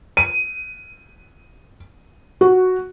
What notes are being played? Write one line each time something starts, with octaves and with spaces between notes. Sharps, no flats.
D#7
F#4